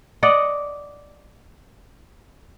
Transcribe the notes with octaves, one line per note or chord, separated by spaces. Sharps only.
D5 D#5 F#5